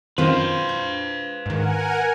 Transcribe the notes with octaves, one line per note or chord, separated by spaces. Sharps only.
F#2 D#3 C4 F4 B4 C5 F5
G6
G#2 D#3 A#4 F#5 G#5